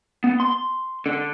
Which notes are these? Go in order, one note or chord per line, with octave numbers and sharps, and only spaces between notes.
B3
C6
D3